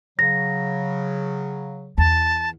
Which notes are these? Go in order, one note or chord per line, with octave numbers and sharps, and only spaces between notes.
C#3 F#3 A#6
E2 A5